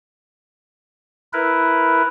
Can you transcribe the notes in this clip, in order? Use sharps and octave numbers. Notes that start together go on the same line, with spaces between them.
E4 A#4 B4